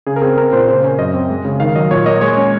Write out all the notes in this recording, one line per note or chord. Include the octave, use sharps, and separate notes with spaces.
C#3 G#4
A#4
C4 G#4
C4 A#4
A#2 C5
C#3 C5
C#4 A#4
F#2 D#5
C4
G#3
C#3
D#3 F5
F#3 D#5
A#2 C#5
A#3 D#5
G#3 C#5
C#4